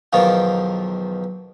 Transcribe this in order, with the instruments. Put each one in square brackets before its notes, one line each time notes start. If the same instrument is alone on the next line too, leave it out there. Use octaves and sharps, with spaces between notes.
[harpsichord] B1 E2 D#3 F3 F4